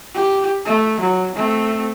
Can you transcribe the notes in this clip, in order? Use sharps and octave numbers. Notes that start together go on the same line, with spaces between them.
G4
A3
F#3
A3 C4